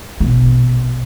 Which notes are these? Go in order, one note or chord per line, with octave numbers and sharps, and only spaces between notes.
A#1 B2